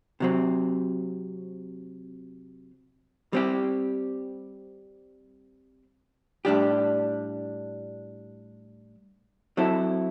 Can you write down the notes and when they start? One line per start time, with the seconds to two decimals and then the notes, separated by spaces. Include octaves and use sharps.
0.20 C3 F#3 C4
3.33 G3 C4 G4
6.45 A2 G3 D4 G4
9.57 F#3 C4 E4 A4